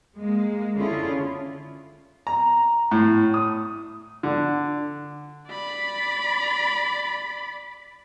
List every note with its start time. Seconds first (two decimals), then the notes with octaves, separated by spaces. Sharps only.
0.17 G#3 A#3
0.77 D3 C#4 E4 F4 G#4
2.27 A#5
2.91 A2
3.34 D#6
4.23 D3
5.49 D5 B5